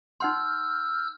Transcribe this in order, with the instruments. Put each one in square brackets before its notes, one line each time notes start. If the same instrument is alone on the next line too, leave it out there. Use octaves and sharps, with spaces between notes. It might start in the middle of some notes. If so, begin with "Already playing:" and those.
[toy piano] D#4 F#5 C6 [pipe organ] E6 F6 G6